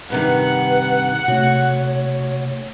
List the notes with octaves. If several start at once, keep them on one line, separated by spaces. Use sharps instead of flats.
G2 C3 D#3 B4 F#5
C3 A3 F#4 C#5